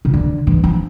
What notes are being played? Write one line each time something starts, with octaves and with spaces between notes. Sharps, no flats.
C3
D3
E3
F3